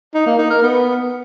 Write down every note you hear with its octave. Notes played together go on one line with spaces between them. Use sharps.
D#4
A#3
D#4
A#4
B3